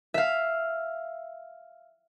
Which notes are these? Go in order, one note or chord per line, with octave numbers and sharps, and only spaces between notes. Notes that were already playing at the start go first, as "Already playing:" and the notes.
E5 F5